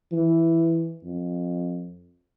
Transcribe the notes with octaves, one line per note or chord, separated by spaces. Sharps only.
E3
F2